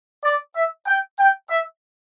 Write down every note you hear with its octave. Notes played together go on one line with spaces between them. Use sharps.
D5
E5
G5
G5
E5